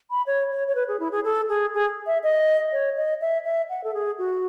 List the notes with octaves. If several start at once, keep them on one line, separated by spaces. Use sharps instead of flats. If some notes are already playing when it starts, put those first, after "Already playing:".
B5
C#5
C#5
C#5
B4
G#4
E4
G#4
A4
G#4
G#4
E5
D#5
C#5
D#5
E5
E5
F#5
A4
G#4
F#4